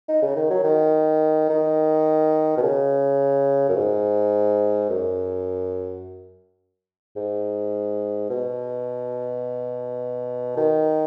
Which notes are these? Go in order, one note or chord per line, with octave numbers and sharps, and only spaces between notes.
D#4
C#3
D#3
F#3
D#3
D#3
B2
C#3
F#2
G#2
F#2
G#2
B2
D#3